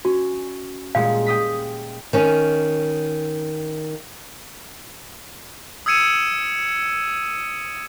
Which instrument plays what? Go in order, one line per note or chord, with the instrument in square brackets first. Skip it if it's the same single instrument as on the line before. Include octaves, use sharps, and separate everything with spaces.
[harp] C#4 [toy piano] F#4
[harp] A#2 G3 G#3 [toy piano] F5
[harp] G5 D#6 B6
[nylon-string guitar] D#3 C#4
[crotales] D#6 E6 G#6 C#7 D#7 E7